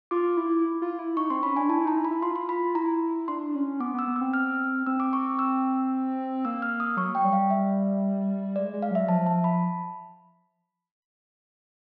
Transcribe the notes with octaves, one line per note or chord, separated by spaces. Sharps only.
F4 D6
E4
F4
E4
D#4 C#6
C4 C6
C#4 B5
D4 G#5
E4 A5
D#4 A#5
E4
B5
E4
F4 C6
C6
B5
E4 A#5
D4 C6
C#4
B3 D6
B3
E6
B3
E6
C4
F6
C4 E6
D6
C#6
E6
A#3 E6
F6
D#6
F#3 C#6
G5
G3
F5
E5
G#3 D5
G#3
F5
F#3 E5
F3 A5
A5
B5